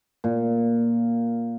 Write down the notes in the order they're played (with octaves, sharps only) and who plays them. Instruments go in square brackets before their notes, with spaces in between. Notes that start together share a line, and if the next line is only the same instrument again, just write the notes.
[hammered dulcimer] A#2